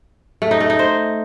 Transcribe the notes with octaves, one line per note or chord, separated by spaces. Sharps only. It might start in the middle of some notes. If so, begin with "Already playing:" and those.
A3
D#4
A3
D#4
C5